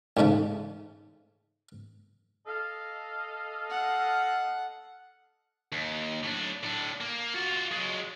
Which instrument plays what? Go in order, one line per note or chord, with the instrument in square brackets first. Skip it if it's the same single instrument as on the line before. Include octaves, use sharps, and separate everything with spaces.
[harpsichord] A1 D#2 G#2 C#3 A3
[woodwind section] A4 D#5 F5
[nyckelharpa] F#5
[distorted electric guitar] D#2
A2 D4
A2 D4
A#3
F4 F#4
F#3 G#3